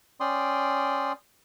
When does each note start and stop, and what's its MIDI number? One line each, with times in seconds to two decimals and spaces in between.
0.20 1.12 61
0.20 1.12 74
0.20 1.12 79
0.20 1.12 84
0.20 1.12 87